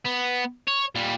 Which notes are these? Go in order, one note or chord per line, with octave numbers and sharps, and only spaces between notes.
B3
C#5
A#2 G3